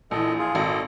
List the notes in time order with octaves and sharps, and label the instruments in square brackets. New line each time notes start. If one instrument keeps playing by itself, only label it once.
[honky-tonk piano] A#1 E3 [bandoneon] A4 D#5
[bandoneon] F4 G#4
[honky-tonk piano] G#1 [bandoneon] A4 D#5